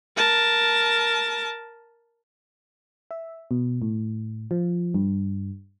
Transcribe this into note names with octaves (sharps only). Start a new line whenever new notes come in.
A#4 A5
E5
B2
A2
F3
G2